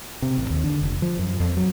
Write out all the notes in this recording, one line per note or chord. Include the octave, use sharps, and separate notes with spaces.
C3
A1
D#2
D3
F1
F3
F#2
F2
F#3